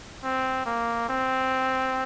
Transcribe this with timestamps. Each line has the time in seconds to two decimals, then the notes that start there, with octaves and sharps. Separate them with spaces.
0.24 C4
0.66 A#3
1.09 C4